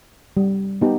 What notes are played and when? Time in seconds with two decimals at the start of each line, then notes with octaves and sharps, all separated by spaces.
0.37 G3
0.81 B3 D#4 G4